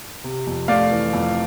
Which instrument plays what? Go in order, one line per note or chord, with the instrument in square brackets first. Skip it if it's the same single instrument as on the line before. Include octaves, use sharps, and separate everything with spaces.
[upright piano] C3
F2
[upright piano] A3 [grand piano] D5 F5
[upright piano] E3
F2